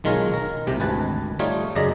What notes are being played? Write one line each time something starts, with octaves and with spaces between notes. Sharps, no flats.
B1 D#3 G#3 F4 A#4 C#5
A#4
C2 C3 G4
G#1 D2 B4 G#5 A5
G3 A3 D#4 F4 C#5
F#2 C#3 D5 D#5 A#5